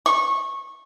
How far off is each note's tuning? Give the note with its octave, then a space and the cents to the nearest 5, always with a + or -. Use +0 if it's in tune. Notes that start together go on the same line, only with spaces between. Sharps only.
C#6 -20